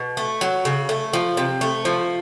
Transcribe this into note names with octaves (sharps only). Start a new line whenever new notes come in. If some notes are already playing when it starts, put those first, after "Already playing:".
Already playing: B2
A3
F#3
C#3
A3
F3
C3
A3
F3